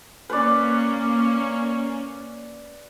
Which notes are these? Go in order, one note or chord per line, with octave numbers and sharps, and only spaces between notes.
A#3 C#4 B4 D5